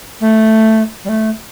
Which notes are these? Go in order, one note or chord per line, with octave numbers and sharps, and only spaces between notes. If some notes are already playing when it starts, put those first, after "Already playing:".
A3
G3
A3